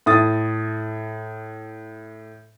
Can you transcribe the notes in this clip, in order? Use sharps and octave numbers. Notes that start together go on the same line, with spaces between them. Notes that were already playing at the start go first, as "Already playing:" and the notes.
A2 D#6 A6